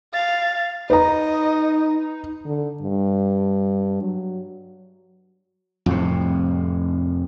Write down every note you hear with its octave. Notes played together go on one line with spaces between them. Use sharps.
F5 A6
D#4 B4 D#5 A#5
D3
G2
F#3
F2 A2 C3